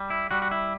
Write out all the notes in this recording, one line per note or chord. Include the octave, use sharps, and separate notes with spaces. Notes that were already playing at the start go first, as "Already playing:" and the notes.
Already playing: G3
E4
G3 F#4
F#4
E4